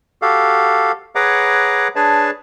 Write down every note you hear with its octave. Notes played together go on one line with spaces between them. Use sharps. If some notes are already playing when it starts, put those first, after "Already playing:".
F#4 G4 A4 F5
G#4 B4 C#5 F#5 A#5 D6
D4 G#4 B4 C#5 A5